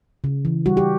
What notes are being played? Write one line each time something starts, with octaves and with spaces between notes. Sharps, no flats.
C#3
E3
G3 F#4
G4